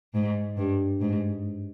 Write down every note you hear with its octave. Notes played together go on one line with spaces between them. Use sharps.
G#2
G2
G#2